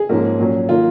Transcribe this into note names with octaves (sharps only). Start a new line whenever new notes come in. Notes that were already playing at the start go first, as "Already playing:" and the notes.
Already playing: G#4
G#2 F3 A#3 C#4
A#2 F#3 C#4
D#3 A#3 F4